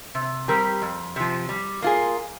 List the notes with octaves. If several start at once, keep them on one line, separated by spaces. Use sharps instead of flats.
C3
G3 C4 G4 A#4
F2
C3 F3
G3
A#3 F4 G#4